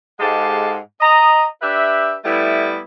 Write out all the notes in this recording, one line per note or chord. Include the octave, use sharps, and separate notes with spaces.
G#2 G#3 G4 A4 F5 A5
D#5 A#5
D4 G4 B4 E5
G3 A3 B3 E4